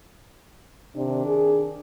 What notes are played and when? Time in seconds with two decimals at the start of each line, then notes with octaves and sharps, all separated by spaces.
0.96 C3 D#3 D4
1.26 G#4